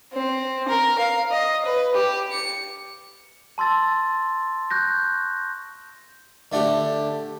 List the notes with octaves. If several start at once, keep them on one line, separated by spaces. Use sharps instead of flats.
C4
A#4
F5
D#5
B4
G4
C#7
A5 C6 E6 A6
C#6 F#6 G6 A#6
D3 A3 D4 G4